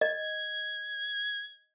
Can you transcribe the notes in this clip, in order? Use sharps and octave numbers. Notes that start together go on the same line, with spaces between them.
D#5 G#6